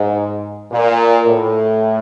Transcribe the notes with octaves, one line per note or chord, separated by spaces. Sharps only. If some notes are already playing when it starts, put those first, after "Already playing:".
Already playing: G#2
A#2
A2